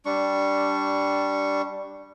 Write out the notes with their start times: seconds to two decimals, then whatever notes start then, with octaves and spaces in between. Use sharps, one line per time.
0.05 G3 D4 C#6